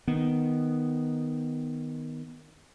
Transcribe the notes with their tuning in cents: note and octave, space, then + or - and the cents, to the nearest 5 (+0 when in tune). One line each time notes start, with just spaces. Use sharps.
D#3 +0 B3 +0